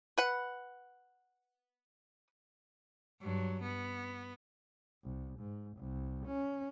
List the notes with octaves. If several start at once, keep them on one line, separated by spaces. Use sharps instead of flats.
B4 F#5
G2 F#3
B3
C2
G#2
C2
C#4